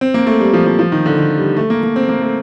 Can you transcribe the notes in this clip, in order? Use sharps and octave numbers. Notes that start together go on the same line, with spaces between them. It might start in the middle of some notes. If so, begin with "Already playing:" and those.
C4
A#3
A3
G3
F3
F3
F3
D#3
D3
D#3
G3
A3
A#3
A#3
C4
A#3
A3